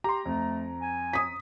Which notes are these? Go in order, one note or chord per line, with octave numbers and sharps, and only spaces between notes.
G4 A#5 C6
F2 A3
G#5
D#6 B6